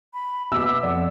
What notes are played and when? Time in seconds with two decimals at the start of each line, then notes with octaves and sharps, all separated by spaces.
0.14 B5
0.52 B2 E5 D6 E6
0.83 F2 D5 F#5